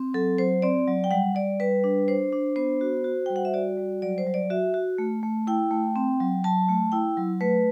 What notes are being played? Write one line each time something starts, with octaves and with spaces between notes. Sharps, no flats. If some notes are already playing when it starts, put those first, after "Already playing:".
Already playing: C4
F#3 A4
F#3 C5
C4 D5
F#3
G5
G3 F#5
G3 D5
G3 B4
D4
D4 C5
D4
B3 C5
F#4
F#4
G3 G5
F#5
E5
F#4 D5
G3
F#3 D5
C5
F#3
D5
F#4 E5
F#4
A3
A3
E4 G5
A3
C4
F#3
F#3 A5
A3
E4 G5
F#3
A3 B4